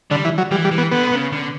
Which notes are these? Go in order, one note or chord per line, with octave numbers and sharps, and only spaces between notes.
D3 G3
E3
F#3
E3 G3
G3
E3
B3
D3 B3
C#3
D3